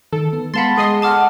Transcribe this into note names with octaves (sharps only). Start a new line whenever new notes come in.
D#3 A4
B3
G#3 B3 F5 F#5 A5 B5 C6 A6
G#3 A4 D#5 C6 D#6
F#5 A5 D6 F6